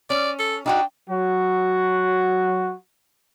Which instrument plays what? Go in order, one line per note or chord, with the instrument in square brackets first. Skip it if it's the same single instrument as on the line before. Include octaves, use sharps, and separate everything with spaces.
[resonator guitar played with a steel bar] C#4 [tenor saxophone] D5
[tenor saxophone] A4
[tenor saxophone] D4 [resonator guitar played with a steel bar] D#4 F4 F#4 [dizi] G5
[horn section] F#3 F#4